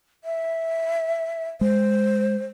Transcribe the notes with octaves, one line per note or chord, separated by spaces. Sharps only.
E5
G#3 C5